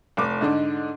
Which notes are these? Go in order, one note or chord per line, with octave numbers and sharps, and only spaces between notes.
F1 D6
G#2 D3 D4 D#4